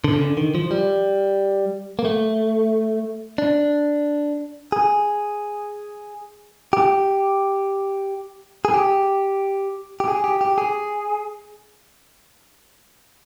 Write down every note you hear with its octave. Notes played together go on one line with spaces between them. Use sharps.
D3
C#3
D3
D#3
F3
G3
A#3
A3
D4
G#4
G4
G#4
G4
G4
G#4
G4
G4
G#4